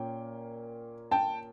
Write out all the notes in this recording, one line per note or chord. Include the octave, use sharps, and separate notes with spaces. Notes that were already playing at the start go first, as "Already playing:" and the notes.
Already playing: A#2 A#3 C#4 G5
G5 A5